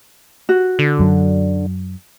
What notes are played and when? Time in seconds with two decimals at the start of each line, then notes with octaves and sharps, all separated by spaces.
0.49 F#4
0.79 D3
0.99 F#2 F#3